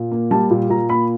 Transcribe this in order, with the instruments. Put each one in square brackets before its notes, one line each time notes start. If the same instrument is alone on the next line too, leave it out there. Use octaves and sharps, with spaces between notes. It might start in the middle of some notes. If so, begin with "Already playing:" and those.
Already playing: [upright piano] A#2
A#3
G3 A5
A#2
A#2 A#5
A#3 B5